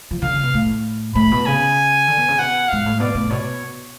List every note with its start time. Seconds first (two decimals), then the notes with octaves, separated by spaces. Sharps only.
0.11 F3
0.22 D3 F5
0.33 C#3
0.43 B2
0.54 A2
1.15 A2 B5
1.31 B2
1.46 C#3 G#5
2.08 D3
2.18 B2
2.28 C#3
2.38 B2 F#5
2.68 G#2 F5
2.86 A2
3.00 B2 D5
3.15 A2
3.30 B2 C#5